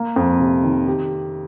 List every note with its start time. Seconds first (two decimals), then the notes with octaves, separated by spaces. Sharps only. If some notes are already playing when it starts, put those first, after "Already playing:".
Already playing: A#3
0.16 F2
0.40 C3
0.63 D#3
0.87 G4